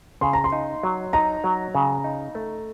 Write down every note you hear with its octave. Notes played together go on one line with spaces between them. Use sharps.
C#3 C6
A#5
C6
D#4
F#3
D#4 A#5
F#3
C#3
D#4
A3